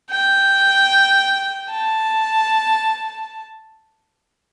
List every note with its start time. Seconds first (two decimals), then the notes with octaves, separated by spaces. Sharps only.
0.10 G5
1.71 A5